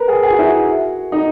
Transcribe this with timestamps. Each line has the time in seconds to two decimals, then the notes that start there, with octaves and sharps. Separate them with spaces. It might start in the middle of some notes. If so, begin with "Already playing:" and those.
Already playing: A#4 B4
0.08 G#4
0.23 G#4
0.31 F#4
0.39 E4
0.46 F#4
1.12 D#4